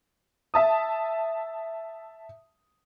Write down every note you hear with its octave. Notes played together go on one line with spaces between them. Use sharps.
E5 A5 D#6